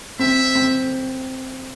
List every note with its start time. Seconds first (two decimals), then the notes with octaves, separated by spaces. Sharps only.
0.19 C4 E5
0.55 C4